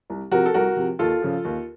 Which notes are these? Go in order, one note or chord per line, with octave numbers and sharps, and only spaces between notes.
C2
C3 F3 F#4 A#4
A4
C2 F#4 A#4
C3 F3
D#2 F4 A4
C#3 F3
D#2